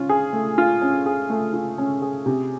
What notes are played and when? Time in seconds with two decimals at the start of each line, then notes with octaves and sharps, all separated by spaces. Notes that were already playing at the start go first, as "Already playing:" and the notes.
Already playing: C#4 F4
0.09 G#4
0.33 A3
0.58 F4
0.82 C#4
1.06 G#4
1.30 A3
1.54 F4
1.78 C#4
2.02 G#4
2.26 C3